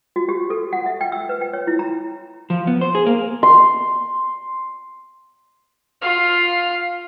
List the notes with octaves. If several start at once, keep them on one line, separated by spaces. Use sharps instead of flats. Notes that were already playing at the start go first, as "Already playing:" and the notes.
F#4
G4
A4
F#5
E5
G5
E6
B4
G5
C#5
E4
A#5
F3
B3
C5
G#4
A#3
C6
F4 F5